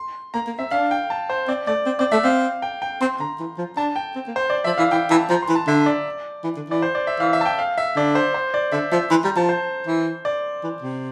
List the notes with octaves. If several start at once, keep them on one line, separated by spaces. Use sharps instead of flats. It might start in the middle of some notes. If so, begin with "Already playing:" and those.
Already playing: C6
A#3 A#5
A#3
C4 E5
D4 F5
G5
A5
C5
C4 D5
A3 D5
C4
C4 D5
A3 E5
C4 F5
G5
G5
C4 C6
D3 A#5
E3
F3
D4 A5
G5
C4
A#3
C5
D5
F3 E5
E3 F5
E3 G5
E3 A5
F3 A#5
C6
E3
A5
D3 E5
D5
E3
D3
E3 D5
C5
D5
E5
E3 F5
E5
A5
G5
F5
E5
D3 D5
C5
C5
D5
D3 E5
F3 E5
E3 C6
G3 A#5
F3 A5
C5
E3
D5
E3
C3